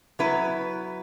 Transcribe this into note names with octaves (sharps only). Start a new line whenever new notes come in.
F#3 B3 E4 B4